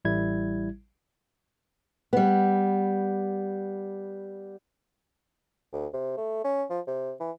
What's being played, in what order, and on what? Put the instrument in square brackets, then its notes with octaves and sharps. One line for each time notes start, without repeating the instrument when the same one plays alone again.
[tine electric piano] A1 G3 E4 G#6
[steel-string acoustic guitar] G3 B3
[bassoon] D2
C3
A3
C#4
F3
C3
E3